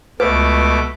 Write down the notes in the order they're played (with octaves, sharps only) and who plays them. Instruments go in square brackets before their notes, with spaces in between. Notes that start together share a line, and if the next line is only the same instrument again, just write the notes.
[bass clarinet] C#2 [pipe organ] B2 A3 D6 [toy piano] B4